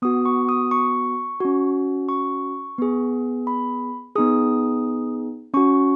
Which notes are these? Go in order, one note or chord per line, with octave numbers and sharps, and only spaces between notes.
B3 F#4 D#6
C#6
D#6
C#6
C#4 F#4
C#6
B3 G#4
B5
B3 D#4 G#4 D#6
C#4 F#4 C#6